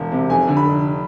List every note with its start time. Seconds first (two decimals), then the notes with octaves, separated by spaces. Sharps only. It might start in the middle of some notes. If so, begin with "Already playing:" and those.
Already playing: E1
0.12 C3
0.30 F1 G#5
0.48 D3
0.57 B5
0.65 F1